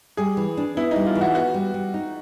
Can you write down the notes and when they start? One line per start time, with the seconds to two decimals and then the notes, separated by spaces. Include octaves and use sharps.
0.17 G3 G#4
0.37 E3
0.57 D4
0.77 B3 E4
0.91 D#4
0.96 G3
1.06 F4
1.15 E3
1.21 F#4
1.35 B3 F#4
1.54 G3
1.74 G3
1.94 D#4